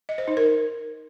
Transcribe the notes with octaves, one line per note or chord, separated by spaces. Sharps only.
D#5
C5
D#4
A#4